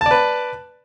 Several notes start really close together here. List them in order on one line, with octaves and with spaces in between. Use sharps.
A5 D5 B4